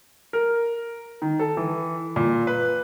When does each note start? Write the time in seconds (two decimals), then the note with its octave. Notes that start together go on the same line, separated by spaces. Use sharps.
0.33 A#4
1.22 D#3
1.39 A4
1.57 E3
2.16 A#2
2.47 B4